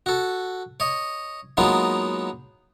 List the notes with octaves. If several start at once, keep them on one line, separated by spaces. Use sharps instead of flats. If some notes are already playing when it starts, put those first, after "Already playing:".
F#4 A4
C#5 D#5
F#3 G#3 A#3 B3 D#4 F4